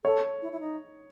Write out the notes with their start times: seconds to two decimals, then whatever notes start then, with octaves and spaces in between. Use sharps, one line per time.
0.04 A4 C#5
0.42 E4
0.52 E4
0.60 D#4